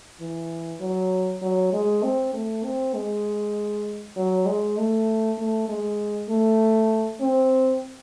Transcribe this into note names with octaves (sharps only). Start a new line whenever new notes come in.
E3
F#3
F#3
G#3
C4
A3
C4
G#3
F#3
G#3
A3
A3
G#3
A3
C4